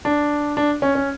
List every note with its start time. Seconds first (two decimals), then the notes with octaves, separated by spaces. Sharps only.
0.05 D4
0.57 D4
0.82 C#4
0.95 C#4